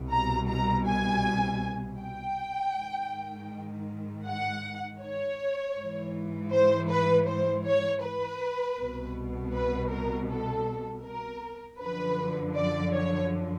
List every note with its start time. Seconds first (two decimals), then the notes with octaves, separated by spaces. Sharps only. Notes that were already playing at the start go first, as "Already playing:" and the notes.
Already playing: C2 B2
0.11 A#5
0.49 A#5
0.87 G#5
1.99 G5
2.75 G#2 D#3
4.26 F#5
5.01 C#5
5.76 G#2 E3
6.52 C5
6.89 B4
7.27 C5
7.65 C#5
8.03 B4
8.78 C2 B2
9.54 B4
9.91 A#4
10.29 A4
11.04 A#4
11.80 F#2 D3 F3 B4
12.55 D5
12.93 C#5